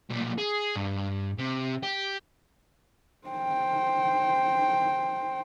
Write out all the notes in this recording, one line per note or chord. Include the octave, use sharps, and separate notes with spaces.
B1 A#2
G#4
G2
C3
G4
C5 G5